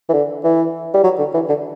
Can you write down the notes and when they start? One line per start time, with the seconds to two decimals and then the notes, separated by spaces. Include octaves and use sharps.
0.09 E3
0.13 D3
0.44 E3
0.94 G3
1.04 F#3
1.19 D3
1.34 E3
1.49 D3